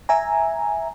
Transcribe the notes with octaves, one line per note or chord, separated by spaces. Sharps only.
E5 G#5 A#5